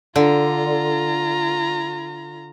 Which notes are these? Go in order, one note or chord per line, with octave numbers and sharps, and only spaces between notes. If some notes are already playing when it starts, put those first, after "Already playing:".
D3 F4 A#5